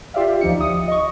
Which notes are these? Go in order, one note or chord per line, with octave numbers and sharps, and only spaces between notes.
F4 G4 D5 E5 F5
D2 F3 D#4 C#7
D#6
D#5 C#6